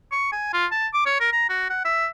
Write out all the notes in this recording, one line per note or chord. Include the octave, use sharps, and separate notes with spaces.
C#6
G#5
F4
A5
D6
C#5
A#4
A#5
F#4
F#5
E5